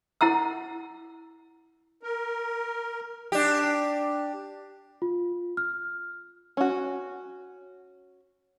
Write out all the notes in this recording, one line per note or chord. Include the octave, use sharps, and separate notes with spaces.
E4 F#5 A#5 E6
A#4
D4 G4
F4
F6
C#4 F#4